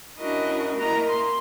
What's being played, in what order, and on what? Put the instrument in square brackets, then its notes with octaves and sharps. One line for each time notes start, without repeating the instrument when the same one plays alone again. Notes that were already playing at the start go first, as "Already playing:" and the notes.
[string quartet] C#4 D4 E4 F#4 A#4 D#5
A#3 E4 A#4 D#5 A#5
C6